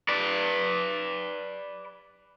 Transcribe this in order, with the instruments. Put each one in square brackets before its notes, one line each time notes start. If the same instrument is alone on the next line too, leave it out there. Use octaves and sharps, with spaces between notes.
[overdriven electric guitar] B4 D5